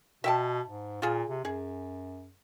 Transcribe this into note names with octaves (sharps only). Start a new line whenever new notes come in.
B2 E5 G5 A5
G#2
A#2 F4 G#4
C3
F#2 G#4